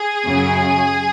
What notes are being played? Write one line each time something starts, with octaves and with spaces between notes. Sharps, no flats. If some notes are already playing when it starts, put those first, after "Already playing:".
Already playing: G#4
F#2 C#3 F#3